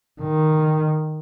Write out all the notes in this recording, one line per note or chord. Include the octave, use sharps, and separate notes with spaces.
D#3